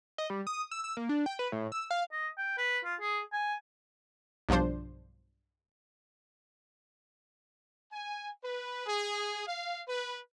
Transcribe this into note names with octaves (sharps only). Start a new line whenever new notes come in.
D#5
G3
D#6
E6
E6
A#3
D4
G5
B4
A2
E6
F5
D#5
G5
B4
F4
G#4
G#5
B1 G2 F3 D4 C5
G#5
B4
G#4
F5
B4